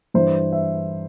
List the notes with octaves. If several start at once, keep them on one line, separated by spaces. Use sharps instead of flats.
G2 E3 C5
E5